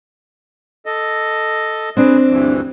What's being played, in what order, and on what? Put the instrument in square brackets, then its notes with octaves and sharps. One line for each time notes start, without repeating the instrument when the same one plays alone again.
[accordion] A4 D#5
[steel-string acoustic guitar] C4 D4 [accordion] G#4 B4
[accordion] D2 G2 E3